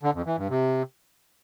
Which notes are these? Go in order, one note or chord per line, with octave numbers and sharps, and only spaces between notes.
D3
F2
E3
G2
C3